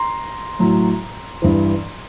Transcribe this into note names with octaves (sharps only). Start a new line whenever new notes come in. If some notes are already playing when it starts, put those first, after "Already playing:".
Already playing: A#5 C6
A2 F#3
G2 E3